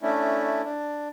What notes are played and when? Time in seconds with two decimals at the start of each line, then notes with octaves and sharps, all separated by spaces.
0.02 A3 C#4 D4 E4
0.63 D4